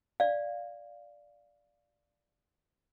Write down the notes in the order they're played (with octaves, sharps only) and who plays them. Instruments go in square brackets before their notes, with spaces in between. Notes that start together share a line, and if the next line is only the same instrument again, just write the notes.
[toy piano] D5 F5